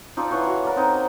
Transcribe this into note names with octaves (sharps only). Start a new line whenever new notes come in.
D#4 F4 A4 D5
E3 C#5 F#5 C6
F#4 C#5
A#4 B4 D5
C4 D#4
D#5